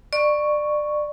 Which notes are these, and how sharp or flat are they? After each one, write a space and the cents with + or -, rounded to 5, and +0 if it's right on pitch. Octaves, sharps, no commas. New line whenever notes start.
D5 +25 C#6 +0